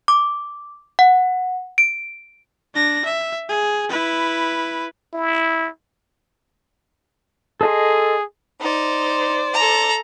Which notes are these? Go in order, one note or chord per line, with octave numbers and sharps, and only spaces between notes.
D6
F#5
D7
D4 A#6
E5
G#4
E4 B4
E4
G#4 A4 D#5 C6
D#4 C5 D5
A4 A#5